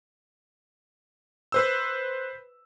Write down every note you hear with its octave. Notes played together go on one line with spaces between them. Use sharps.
B4 C5 E6